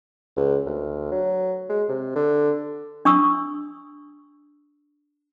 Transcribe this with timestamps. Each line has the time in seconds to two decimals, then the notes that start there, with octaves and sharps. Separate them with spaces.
0.36 C#2
0.66 D2
1.12 F#3
1.69 G#3
1.88 C3
2.15 D3
3.05 D4 C#6 D#6 E6